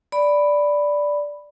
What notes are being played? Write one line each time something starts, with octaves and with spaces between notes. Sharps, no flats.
D5 B5